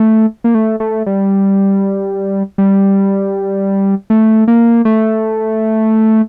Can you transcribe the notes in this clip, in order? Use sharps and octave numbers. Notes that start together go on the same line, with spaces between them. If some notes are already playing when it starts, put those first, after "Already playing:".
Already playing: A3
A#3
A3
A3
G3
G3
A3
A#3
A3